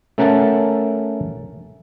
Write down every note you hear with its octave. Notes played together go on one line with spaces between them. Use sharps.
A3 C#4 A#4 F#5 A5